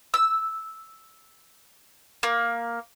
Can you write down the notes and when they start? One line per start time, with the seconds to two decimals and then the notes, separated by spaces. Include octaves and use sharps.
0.14 E6
2.23 A#3